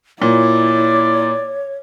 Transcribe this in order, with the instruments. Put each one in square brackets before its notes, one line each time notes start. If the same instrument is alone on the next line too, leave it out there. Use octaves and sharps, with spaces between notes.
[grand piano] A#2 [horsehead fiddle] E4 [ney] C#5 [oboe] D5